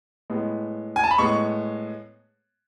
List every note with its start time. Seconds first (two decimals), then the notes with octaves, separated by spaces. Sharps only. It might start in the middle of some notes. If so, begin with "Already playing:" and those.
0.30 A2 G#3 B3
0.96 G#5
1.04 A5
1.11 B5
1.18 A2 G#3 B3 C#6